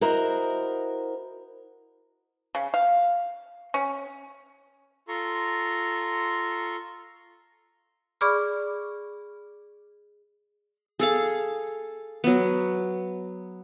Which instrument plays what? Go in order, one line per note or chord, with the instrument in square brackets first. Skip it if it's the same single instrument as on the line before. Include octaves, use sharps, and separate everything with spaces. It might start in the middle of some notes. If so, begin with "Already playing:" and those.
[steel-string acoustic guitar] E4 F#4 A#4 C5 D#5
[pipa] C#3
F5
C#4
[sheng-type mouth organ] F4 A4 A#5 C6 C#6
[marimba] G#4 D5 B5 C#6 D6 F6
[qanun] G#4 A4 F5
F#3 B3